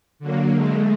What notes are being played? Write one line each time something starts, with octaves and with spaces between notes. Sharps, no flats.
D3 F#3 A#3
G#3 A3